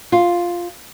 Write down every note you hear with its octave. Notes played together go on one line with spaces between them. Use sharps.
F4